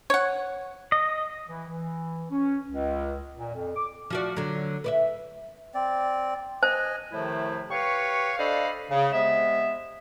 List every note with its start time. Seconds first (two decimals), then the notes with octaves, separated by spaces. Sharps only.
0.10 C#5 F#5
0.92 D#5
1.49 E3
1.68 E3
2.30 C#4
2.70 C#2
3.38 A#2
3.53 F2
3.76 D6
4.10 F3 F#4 D5
4.37 D3 F#3
4.84 B4 D5 E5
5.74 C4 D5
6.63 C5 D#5 G#5
7.12 A2 C3 D#3 F3 A3 E4
7.70 G4 B4 C#5 F5 C#6
8.37 D4 A4 C5 D#5 F5 B5
8.91 C#3
9.13 C3 G#3 B3 E5